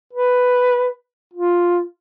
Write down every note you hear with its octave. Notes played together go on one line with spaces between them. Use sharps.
B4
F4